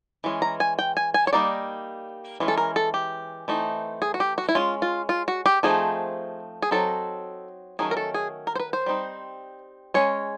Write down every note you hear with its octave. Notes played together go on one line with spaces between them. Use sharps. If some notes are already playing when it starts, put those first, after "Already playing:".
E3 G#3 C#4
A#5
G#5
G5
G#5
G#5
C#5
G3 A#3 D#4 D5
E3 G#3 C#4
A4
A#4
A4
G4
E3 A3 C4 D#4
G#4
F#4
G4
F#4
E4
G#3 C#4 F4
F4
F4
F#4
G4
F3 A3 C4 D#4 G#4
G#4
F#3 A3 C4 D#4 A4
D#3 F#3 A3 C#4 G#4
A#4
A4
G#4
A#4
C5
B4
C5
G3 C4 D#4
G#3 C#4 C#5